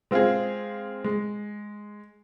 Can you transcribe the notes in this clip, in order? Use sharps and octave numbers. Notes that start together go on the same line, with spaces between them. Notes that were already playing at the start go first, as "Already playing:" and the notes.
G#3 C4 F4 G#4
G#3